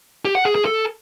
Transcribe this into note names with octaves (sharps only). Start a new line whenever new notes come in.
G4
F#5
G#4
G#4
A4